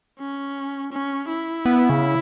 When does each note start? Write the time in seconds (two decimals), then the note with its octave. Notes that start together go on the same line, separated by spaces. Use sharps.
0.19 C#4
0.92 C#4
1.29 E4
1.66 B3
1.90 C#3